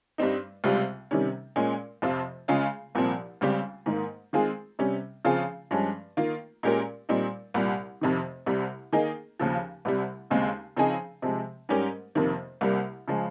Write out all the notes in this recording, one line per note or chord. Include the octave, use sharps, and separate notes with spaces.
G2 G3 C4 D#4
C#2 C3 G3 C4 F4
C3 D#3 G3 C#4
A#2 G#3 C#4
F2 C3 F3 C4 F4
C#3 G#3 C#4 F4 G#4
C2 A#2 F3 C4
C#2 C#3 G3 C4 G4
G#2 D#3 A#3
D#3 G#3 C4 F4 G#4
C3 G3 C#4
C#3 F3 C4 F4 G#4
G2 F3 G#3 C#4
D#3 A#3 F4
A#2 G#3 C#4 G4 A#4
A#2 G3 C4 D#4
C2 A#2 G3
F2 C3 D#3
C2 C3 G3
D#3 A#3 D#4 G#4
D#2 C#3 F3
C2 C3 G3
D#2 C#3 G#3 C4
C#3 F3 C4 D#4 G#4
C3 F3 G#3
G#2 G3 C#4 G4 A#4
F2 C3 D#3 A#3
C2 C3 G3 A#3
C#3 F3 G#3